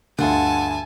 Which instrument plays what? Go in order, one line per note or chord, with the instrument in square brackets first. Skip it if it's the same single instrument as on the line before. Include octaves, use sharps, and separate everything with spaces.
[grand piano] D2 G2 D3 [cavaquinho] F4 F#5 [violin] G#5 A5